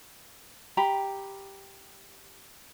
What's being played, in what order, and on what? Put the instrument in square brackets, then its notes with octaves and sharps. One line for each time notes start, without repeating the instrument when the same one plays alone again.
[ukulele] G4 A#5 B5